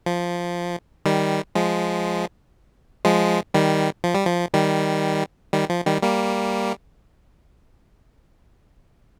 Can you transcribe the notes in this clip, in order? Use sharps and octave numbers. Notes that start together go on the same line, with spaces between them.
F3
D#3 G3
F3 G#3
F3 G#3
D#3 G3
F3
G3
F3
D#3 G3
D#3 G3
F3
D#3 G3
G3 A#3